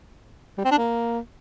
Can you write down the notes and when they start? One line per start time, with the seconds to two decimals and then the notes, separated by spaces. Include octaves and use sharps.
0.58 G3
0.65 C4
0.71 D4
0.78 A#3